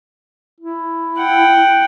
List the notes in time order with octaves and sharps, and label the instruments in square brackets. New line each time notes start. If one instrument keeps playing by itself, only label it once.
[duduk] E4
[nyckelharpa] F#5 G5